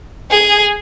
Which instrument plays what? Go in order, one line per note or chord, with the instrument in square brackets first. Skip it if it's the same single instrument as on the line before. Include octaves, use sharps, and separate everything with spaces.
[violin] G#4